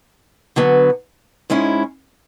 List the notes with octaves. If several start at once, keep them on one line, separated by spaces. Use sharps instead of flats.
D3 F#3 B3
G#2 G#3 C#4 E4